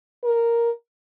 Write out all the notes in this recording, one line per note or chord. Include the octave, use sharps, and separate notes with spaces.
A#4